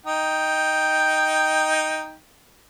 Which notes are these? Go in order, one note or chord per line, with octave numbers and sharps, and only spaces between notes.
D#4 G5